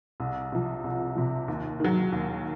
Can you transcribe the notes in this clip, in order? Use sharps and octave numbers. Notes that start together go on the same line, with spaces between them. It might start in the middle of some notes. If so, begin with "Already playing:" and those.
C2
C3 F3
C2
C3 F3
D#2
D#3 F#3
D#2